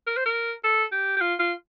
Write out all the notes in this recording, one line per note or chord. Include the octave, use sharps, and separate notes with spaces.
A#4
C5
A#4
A4
G4
G4
F4
F4